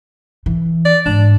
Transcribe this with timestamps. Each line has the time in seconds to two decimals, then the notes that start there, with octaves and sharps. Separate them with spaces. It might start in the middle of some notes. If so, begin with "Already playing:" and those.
0.46 E3
0.85 D5
1.06 G#2 D4